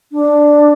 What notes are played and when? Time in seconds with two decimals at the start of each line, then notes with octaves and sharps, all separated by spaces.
0.12 D4